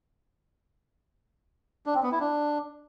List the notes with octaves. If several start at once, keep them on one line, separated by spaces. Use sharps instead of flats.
D4
C4
B3
E4
D4